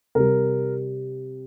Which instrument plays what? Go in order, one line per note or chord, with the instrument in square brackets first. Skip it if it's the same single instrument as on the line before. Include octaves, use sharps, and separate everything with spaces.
[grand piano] C3 G3 A#4